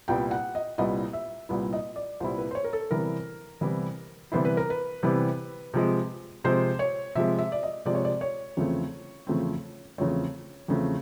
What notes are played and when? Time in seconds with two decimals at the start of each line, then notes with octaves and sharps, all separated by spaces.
0.08 C2 A#2 G3 B3 E4 G5
0.31 F#5
0.55 D#5
0.78 C2 A#2 G3 B3 E4 D#5
1.13 E5
1.49 C2 A#2 G3 B3 E4
1.73 D#5
1.96 D5
2.20 C2 A#2 G3 B3 E4 C5
2.38 B4
2.51 C5
2.55 C#5
2.64 A#4
2.73 A4
2.91 C3 E3 G3 B3 E4 A#4
3.61 C3 E3 G3 B3 E4
4.32 C3 E3 G3 B3 E4 C5
4.45 B4
4.57 A#4
4.70 B4
5.03 C3 E3 G3 B3 E4
5.74 C3 F3 G#3
6.44 C3 F3 G#3 C5
6.79 C#5
7.15 C3 F3 G#3 E5
7.39 E5
7.52 D5
7.63 D#5
7.86 C3 F3 G#3 D5
7.95 C#5
8.05 D5
8.21 C#5
8.57 E2 C#3 F3 A3 C4
9.27 E2 C#3 F3 A3 C4
9.98 E2 C#3 F3 A3 C4 C#5
10.68 E2 C#3 F3 A3 C4